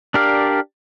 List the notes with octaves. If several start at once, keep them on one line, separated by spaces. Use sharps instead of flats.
D4 G4 A#4 D5 F5